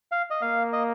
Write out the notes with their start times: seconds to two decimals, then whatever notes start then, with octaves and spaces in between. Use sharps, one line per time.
0.12 F5
0.30 D#5
0.42 A#3 F5
0.73 D#5